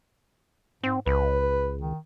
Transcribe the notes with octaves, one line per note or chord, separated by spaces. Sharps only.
G#2 C4
C#2 B4
D#3